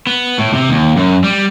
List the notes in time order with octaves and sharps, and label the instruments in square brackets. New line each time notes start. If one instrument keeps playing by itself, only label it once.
[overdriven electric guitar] B3
A2
C3
D#2
F#2
G3